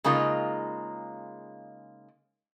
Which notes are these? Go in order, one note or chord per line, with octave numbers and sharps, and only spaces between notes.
C#3 G#3 A#3 D#4 F4